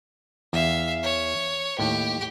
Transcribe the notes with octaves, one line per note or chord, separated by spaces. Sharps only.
E2 E5 F5
C#5
D#2 A2 G4